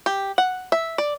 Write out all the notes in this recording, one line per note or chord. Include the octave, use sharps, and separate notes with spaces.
G4
F#5
E5
D5